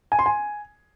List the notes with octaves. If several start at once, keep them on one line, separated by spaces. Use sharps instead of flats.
G#5
C6
G#5